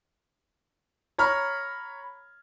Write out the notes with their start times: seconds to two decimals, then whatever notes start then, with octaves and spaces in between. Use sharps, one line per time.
1.18 C#5 A#5 B5 F6